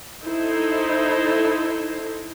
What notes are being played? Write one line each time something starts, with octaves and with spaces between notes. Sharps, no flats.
D#4 E4 A4 C5